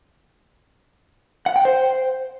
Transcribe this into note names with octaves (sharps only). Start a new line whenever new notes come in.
F#5
G5
C5